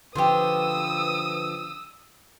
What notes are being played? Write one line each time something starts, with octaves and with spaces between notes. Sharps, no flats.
D3 F3 G4 B4 C5 D#6 E6